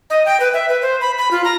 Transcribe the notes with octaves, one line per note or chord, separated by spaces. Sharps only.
D#5
G5
B4
E5
B4
C5
B5
B5
F4
A#5